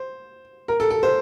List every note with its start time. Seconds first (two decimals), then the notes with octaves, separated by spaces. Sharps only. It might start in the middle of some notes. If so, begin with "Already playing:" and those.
Already playing: C5
0.68 A#4
0.80 A4
0.90 A4
1.03 C5